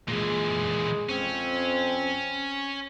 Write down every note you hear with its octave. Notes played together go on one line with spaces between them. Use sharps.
A#2 E3 G#3
F2 C4 C#4